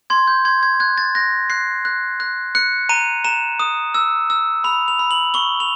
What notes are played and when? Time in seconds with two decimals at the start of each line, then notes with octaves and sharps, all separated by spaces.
0.10 C6 G#6
0.27 G6
0.45 C6 G#6
0.63 G#6
0.80 F#6 G#6
0.98 A6
1.15 F#6 A#6
1.50 F#6 C7
1.85 F#6
2.20 F#6
2.55 F#6 C#7
2.89 A#5 D#7
3.24 A#5 E7
3.60 D#6
3.94 E6
4.30 E6
4.64 B5 F7
4.88 F7
4.99 B5
5.11 F#7
5.34 C#6 G7
5.60 F7